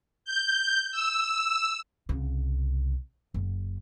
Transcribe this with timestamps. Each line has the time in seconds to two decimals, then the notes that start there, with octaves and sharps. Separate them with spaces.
0.25 G6
0.92 E6
2.09 C2 C#3
3.34 F#1